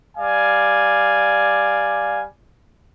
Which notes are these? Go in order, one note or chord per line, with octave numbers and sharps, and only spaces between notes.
G3 D5 F5 G#5